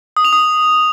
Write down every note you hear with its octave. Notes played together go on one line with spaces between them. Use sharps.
D#6
F7
D#6